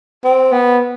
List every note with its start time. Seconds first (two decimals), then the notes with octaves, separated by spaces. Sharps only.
0.24 C4
0.52 B3